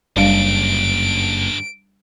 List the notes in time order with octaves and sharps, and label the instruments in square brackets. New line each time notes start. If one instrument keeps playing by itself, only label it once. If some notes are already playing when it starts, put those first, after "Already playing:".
[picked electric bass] F#1 [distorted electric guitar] G2 D3 [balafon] G3 D4 F5 [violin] D7